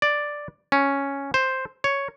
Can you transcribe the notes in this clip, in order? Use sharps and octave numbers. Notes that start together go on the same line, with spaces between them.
D5
C#4
C5
C#5